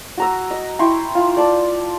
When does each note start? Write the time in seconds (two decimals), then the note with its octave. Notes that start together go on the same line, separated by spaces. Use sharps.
0.18 F#4 A#5 E6
0.51 D#5
0.79 E4 G5 C6 C#6
1.15 F4
1.37 D5 A5